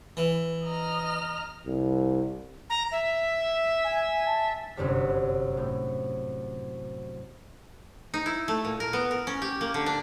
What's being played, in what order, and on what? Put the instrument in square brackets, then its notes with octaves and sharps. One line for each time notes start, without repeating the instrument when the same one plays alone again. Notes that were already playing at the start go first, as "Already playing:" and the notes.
[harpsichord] E3
[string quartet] D#5 A#5 F6
[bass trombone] C2
[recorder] A#5
E5
[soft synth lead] G#5
A5
[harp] G1 F#2 C3 G3 B6
A2
[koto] D#4
E4
A3
A#2
A#4
B3
A#4
C#4
G4
A#3
D3
D4